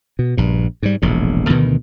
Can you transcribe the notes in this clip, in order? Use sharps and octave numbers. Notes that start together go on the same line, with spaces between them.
B2
A#1 G2
G#2 G3
E1 A#1 A2
D2 B2 D#3 E3